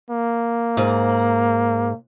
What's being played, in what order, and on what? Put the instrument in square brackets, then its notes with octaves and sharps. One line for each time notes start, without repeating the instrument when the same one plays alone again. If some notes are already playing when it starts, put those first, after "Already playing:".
[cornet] A#3
[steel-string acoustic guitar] G#2